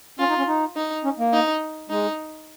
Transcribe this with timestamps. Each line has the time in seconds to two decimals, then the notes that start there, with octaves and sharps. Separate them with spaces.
0.19 C#4 F4
0.29 D#4
0.38 C#4
0.48 D#4
0.76 D#4
1.05 C#4
1.19 A#3
1.33 D#4
1.90 G#3 D#4